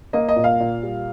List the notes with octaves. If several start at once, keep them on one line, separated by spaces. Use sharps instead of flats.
A#3 D#5
D#5
A#2
F5
A#2
G3